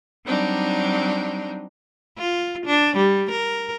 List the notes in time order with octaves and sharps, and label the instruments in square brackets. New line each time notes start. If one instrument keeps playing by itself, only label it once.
[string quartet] F#3 G3 C4 D4 D#4
[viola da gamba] F4
D4
G3
A#4